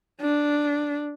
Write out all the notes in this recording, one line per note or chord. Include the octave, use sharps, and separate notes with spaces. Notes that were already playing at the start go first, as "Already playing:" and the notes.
D4